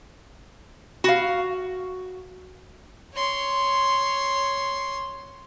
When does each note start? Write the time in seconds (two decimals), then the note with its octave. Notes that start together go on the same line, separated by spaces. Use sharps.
1.04 F#4 F5
3.15 C#5 C6